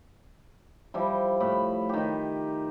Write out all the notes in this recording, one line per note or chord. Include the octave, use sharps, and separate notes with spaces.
F3 G3 E4
A2 B5
D#3 G4